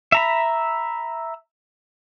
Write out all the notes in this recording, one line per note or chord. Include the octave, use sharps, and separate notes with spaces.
E5 A#5 B5